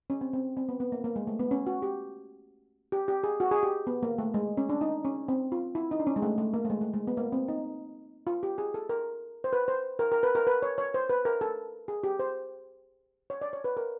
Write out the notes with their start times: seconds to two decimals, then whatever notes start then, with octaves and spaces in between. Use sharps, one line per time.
0.10 C#4
0.21 C4
0.33 C4
0.57 C4
0.69 B3
0.80 B3
0.92 A#3
1.04 A#3
1.16 G#3
1.27 A3
1.39 B3
1.51 C#4
1.66 F#4
1.82 G4
2.92 G4
3.08 G4
3.24 G#4
3.40 F#4
3.51 G#4
3.63 G4
3.87 B3
4.03 A#3
4.18 A3
4.34 G#3
4.57 C#4
4.69 D4
4.81 D#4
5.05 C#4
5.28 C4
5.52 F4
5.75 E4
5.91 D#4
6.00 D4
6.07 C#4
6.16 G#3
6.22 A3
6.38 A3
6.54 A#3
6.65 A3
6.70 G#3
6.81 A3
6.93 G#3
7.07 B3
7.17 A#3
7.32 C4
7.48 D#4
8.27 F4
8.43 G4
8.58 G#4
8.74 A4
8.89 A#4
9.44 C5
9.53 B4
9.68 C5
9.99 A#4
10.12 A#4
10.23 B4
10.35 A#4
10.47 B4
10.62 C#5
10.78 C#5
10.94 C5
11.10 B4
11.25 A#4
11.41 A4
11.88 G#4
12.04 G4
12.19 C5
13.30 C#5
13.41 D5
13.53 C#5
13.64 B4
13.77 A#4